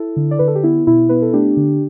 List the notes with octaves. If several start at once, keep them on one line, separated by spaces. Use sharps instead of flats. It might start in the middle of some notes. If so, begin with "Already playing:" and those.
Already playing: E4 A4
D3
D5
D3 B4
A4
G4
B3 E4
B2 E4
B3 B4
A4
A3 D4 G4
D3